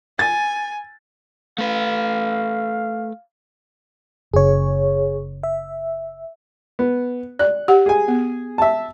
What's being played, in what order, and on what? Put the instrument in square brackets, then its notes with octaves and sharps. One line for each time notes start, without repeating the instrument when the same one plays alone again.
[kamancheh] G#5 [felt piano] A6
[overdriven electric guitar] A3 B4 [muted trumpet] F5
[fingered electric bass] F#1 C#3 [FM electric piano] G#4 C#5
[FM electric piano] E5
[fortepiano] B3
[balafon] D5 [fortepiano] F#6
[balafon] G4 F#5
[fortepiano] G#4 G#5
[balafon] B3
[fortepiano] E5 A5